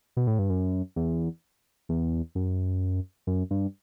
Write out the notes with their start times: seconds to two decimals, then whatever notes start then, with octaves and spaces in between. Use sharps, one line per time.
0.17 B2
0.27 A2
0.39 G2
0.50 F#2
0.96 E2
1.89 E2
2.35 F#2
3.27 F#2
3.51 G2